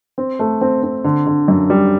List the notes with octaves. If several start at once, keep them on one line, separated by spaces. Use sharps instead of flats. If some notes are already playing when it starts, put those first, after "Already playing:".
C4
A3
C4
C4
D3
D3
F#2
G3